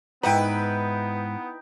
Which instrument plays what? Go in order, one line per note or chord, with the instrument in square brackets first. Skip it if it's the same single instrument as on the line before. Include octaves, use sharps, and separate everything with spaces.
[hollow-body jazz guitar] G#2 F#5 B5 [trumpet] B3 [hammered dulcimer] D#4 G5 [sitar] E4 B4